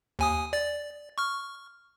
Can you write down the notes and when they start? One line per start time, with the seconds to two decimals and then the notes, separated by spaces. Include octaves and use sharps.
0.19 D#2 G#5 D#6
0.53 D5 A6
1.18 C#6 F6